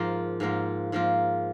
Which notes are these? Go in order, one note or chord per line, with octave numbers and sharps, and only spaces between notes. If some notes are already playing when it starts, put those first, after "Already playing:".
Already playing: G#2 F3 A#3 F4
G#2 F3 A#3 F4
G#2 F3 A#3 F4